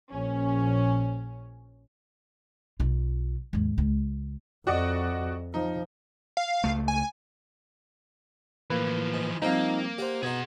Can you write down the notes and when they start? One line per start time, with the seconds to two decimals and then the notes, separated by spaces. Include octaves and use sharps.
0.11 A#1 C#4
2.80 B1 F4
3.53 D#2 G#2
3.78 C#2
4.67 F2 F#4 D5 D#5
5.54 F3 D#4
6.37 F5
6.64 C#2 A3
6.88 G#5
8.70 A2 E3 F3 A#3 B4
9.14 G#2
9.42 F3 G3 A#3 C4 D#4 F5
9.98 G4 C5 D5 F#5
10.23 B2 B3 D#4 G#4 F#5 G#6